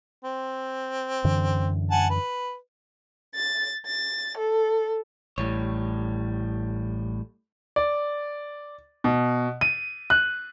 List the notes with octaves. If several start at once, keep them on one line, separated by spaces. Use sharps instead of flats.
C4
F#2 D3 E3
F#5 G#5 A5
B4
A6
A6
A4
A1 A2 G3 C#5
D5
B2
D#7
F#6